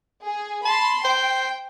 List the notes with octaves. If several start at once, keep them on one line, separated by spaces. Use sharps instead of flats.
G#4
A5 B5 C6
C5 G5